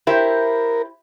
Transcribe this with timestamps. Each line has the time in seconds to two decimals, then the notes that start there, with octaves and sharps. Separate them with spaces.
0.07 E4 G4 A#4 C5